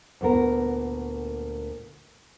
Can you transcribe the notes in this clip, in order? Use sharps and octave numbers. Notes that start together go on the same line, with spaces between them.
D2 A#2 B3 A#4